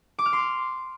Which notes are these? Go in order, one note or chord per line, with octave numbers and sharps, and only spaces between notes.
D6
F6
C6